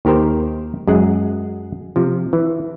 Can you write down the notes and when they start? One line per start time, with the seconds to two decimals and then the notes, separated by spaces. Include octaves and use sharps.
0.05 D#2 D#3 G4 A#4 C5
0.87 F#2 G#3 G#4 F#5
1.96 C3 F3
2.33 E3